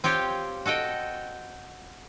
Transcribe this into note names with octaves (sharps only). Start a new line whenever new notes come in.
C4 F4 G4 C#5
F#4 A4 D#5 G5